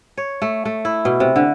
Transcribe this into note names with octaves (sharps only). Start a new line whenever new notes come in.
C#5
A3
A3
E4
B2
C3
D3